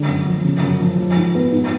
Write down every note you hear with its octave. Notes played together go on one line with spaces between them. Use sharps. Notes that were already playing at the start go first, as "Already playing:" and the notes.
Already playing: D3 G#3
F#2
F3
C#3
F#2
F3
F3
G#2
B3
G#2